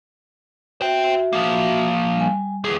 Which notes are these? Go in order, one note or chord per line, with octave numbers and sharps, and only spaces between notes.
F#4 C5 E5 G5
F3 A#3
G3 G#5
D#2 G#4